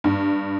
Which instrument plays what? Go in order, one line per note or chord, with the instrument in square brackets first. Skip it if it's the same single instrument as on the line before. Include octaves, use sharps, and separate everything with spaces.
[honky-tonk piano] G2